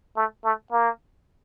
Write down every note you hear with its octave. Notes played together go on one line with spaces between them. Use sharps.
A3
A3
A#3